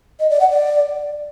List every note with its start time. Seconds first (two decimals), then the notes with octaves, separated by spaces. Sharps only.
0.20 D#5
0.30 D5
0.40 F#5
0.50 D5